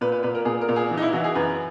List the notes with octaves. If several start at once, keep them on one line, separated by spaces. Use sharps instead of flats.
A#2 B4
B4
A#2 B4
A#4
A#2 G#4
A#4
A#2
G#4
E3
D#4
E4
E3 F#4
G#4
F#2 B4